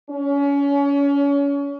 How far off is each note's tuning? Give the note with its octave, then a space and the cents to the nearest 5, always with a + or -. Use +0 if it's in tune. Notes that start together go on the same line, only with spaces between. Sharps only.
C#4 +30